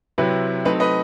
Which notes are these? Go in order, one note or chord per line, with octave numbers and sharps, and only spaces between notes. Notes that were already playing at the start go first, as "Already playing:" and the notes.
C3 F#3 C4 E4 B4
F#3 A3 C4 D#4 B4
B4 D#5